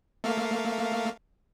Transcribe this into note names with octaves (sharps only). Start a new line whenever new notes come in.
A3 A#3 F5